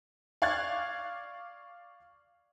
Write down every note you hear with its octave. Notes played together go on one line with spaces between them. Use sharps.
D5 F5 C#6 F#6 G#6 A6